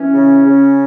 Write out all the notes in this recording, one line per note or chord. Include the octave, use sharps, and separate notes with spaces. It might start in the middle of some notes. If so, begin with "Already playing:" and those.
Already playing: E3 C#4
C#3
C#3